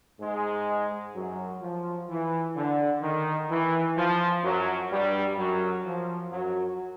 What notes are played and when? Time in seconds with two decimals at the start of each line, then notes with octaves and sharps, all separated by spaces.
0.20 G#2 G#3
1.15 F#2 F#3
1.61 F3
2.09 E3
2.56 D3
3.02 D#3
3.49 E3
3.97 F3
4.43 F#2 F#3
4.91 G2 G3
5.38 F#2 F#3
5.85 F3
6.32 F#2 F#3